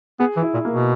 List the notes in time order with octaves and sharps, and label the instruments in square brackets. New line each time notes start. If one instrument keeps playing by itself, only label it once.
[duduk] B3 [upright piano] G#4
[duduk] E3
[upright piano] E4
[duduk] A#2
[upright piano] A#3
[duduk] B2